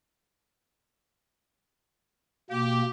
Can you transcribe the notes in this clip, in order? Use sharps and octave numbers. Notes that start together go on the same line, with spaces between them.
B2 A#3 G4